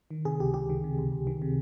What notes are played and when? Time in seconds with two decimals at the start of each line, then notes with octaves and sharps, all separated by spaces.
0.11 D#3
0.25 C3 G#4
0.40 C#2 G4
0.54 C#2 G4
0.70 D#3
0.84 C3
0.98 C#2
1.12 C#2
1.27 D#3
1.42 C3